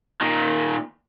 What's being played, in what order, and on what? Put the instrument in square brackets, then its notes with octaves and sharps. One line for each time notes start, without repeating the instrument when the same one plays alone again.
[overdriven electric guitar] A#2 D#3